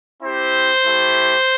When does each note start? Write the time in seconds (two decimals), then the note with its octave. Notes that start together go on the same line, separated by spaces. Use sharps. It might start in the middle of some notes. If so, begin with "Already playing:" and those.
0.22 C4 E4 G4 C5
0.85 A3 E4 G4